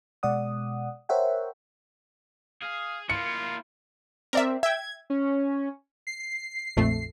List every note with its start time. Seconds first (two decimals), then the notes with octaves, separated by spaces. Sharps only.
0.23 B2 G#3 D5 F#5 D#6
1.09 A#4 C5 C#5 E5 F#5 G5
2.62 G#4 F5
3.10 A#3 E4 F4 C#7
4.33 C4 A#4 D5 E5
4.63 E5 G5 G#6
5.10 C#4
6.07 C7
6.77 A#1 F2 A3